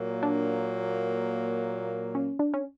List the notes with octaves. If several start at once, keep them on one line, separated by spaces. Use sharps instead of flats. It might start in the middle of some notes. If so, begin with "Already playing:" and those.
Already playing: A#2 F#3 A#3
D4
C#4
D4
C#4